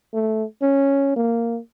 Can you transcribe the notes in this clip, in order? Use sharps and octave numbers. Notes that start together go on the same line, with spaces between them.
A3
C#4
A#3